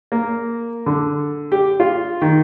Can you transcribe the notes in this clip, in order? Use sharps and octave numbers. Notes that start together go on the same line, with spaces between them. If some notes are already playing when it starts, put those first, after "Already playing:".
A#3
D3
G4
F4
D#3